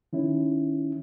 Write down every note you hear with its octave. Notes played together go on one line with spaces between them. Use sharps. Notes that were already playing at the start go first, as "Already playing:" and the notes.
D#3 C#4 E4